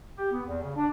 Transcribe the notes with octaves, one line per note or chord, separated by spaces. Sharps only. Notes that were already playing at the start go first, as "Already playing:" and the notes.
G4
B3
E2
C#3
D4